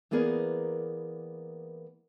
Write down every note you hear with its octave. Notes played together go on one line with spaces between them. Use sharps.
E3 A#3 B3 G#4 A#4 D5